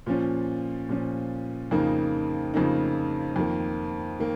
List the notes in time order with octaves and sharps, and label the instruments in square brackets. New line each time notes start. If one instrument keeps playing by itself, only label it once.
[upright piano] A#2 F3 C#4
A#2 F3 C#4
F2 C#3 A#3 D#4
F2 C#3 A#3 D#4
F2 D#3 A#3
D#3 A#3